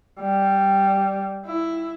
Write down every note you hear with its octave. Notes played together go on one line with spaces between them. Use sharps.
G3
E4